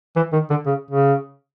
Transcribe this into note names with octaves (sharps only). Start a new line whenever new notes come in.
E3
D#3
D3
C#3
C#3